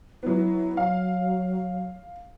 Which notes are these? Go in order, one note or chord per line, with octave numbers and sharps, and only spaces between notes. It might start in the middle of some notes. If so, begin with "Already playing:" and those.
F#3 B3 E4
F#3 F5